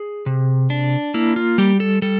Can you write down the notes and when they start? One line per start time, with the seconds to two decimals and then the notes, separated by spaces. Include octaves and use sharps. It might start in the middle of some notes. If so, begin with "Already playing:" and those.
Already playing: G#4
0.26 C3
0.70 D4
1.14 A#3 E4
1.36 F4
1.58 G3 G4
1.80 A4
2.02 G3 A4